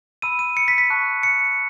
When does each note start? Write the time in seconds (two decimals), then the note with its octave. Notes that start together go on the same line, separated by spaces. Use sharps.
0.22 B5 E6 D#7
0.39 D#7
0.57 C#7
0.68 B6
0.78 B6
0.90 A5 C#6 F#6
1.23 C#7